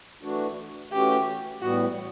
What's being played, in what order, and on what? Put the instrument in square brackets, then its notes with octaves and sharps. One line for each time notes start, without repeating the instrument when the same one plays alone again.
[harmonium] E3 A3 D4 F#4
[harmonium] E3 A3 C#4 F#4 [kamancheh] G4
[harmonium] A2 E3 G3 B3 [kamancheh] F#4